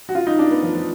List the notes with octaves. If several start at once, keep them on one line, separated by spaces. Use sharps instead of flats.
F#4
F4
D#4
D4
B3
F3
F3